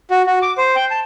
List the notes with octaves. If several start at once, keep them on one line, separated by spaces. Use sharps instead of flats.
F#4
F#4
D6
C5
G5
A5